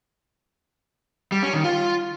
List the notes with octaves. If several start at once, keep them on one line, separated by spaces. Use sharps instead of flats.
G3
C#4
D#3
F4